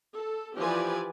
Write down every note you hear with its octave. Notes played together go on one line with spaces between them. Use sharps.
A4
E3 F3 G4 B4 D5 G#5